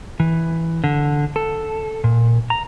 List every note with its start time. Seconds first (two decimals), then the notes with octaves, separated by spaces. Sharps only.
0.20 E3
0.84 D3
1.36 A4
2.04 A#2
2.50 A#5